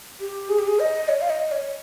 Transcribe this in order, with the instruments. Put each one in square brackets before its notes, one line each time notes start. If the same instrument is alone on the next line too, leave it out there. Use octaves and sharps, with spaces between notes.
[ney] G4
G#4
G4
G#4
D#5
C#5
F5
D#5
C#5